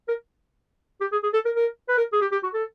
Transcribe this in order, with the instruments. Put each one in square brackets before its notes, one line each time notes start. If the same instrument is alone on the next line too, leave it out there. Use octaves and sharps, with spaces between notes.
[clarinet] A#4
G4
G#4
G#4
A4
A#4
A#4
B4
A#4
G#4
G4
G4
F#4
A4